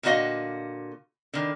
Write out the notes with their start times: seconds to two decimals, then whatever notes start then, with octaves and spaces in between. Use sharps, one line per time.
0.03 A#2 D3 D4 F#4 D#5 F5
1.33 D3 D#3